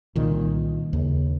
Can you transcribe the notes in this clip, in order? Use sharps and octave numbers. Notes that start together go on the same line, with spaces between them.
C2 A#2 D#3
D#2 C#3